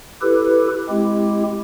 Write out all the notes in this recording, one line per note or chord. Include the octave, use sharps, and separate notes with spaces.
E4 G4 A4 B4
G#3 C4 E4 G4